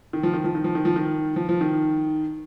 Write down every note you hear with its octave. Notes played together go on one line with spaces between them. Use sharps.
D#3
F3
D#3
F3
D#3
F3
D#3
F3
D#3
F3
F3
D#3